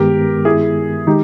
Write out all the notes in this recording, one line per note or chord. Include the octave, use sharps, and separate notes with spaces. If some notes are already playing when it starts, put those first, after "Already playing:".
Already playing: G2 D#3 G#3 B3 G4 A#4
E4 G#4
D#3 G#3 D#4 G4